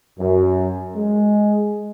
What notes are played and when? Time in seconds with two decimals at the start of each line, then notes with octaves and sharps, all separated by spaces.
0.19 F#2
0.96 G#3